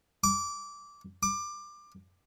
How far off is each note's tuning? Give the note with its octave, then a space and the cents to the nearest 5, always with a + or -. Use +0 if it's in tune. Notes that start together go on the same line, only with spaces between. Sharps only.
D6 -15
D6 +20